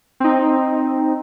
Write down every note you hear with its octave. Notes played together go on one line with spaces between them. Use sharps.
C4 D#4